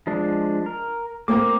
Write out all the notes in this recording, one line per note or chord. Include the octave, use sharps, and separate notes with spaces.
F3 G#3 D4
A#4
A#3 C4 A#4 D6